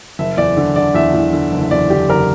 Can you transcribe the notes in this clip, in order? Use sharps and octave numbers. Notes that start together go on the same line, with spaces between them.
F#1 E5
E2 D5
D3
D3 D5
E2 E5
E2
D3
F#1
E2 D5
D3 G4
F#1 A#4